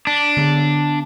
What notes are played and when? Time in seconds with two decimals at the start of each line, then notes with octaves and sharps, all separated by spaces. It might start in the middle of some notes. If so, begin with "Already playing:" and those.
0.07 D4 B6 F#7
0.37 D3 B3